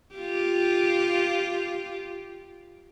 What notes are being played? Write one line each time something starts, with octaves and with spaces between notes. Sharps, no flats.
F4 G4